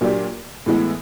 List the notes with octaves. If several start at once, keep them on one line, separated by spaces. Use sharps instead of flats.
A#2 F#3 A#3 D4 G4
A2 E3 G#3 B3 E4